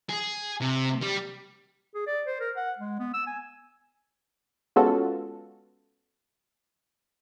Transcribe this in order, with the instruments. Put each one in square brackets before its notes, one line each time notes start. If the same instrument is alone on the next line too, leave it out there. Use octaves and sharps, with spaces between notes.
[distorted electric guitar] G#4
C3
G3
[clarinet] G#4
D5
C5
A#4
F#5
G#3
B3
E6
G#5
[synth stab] G#3 B3 C#4 F4 F#4 A4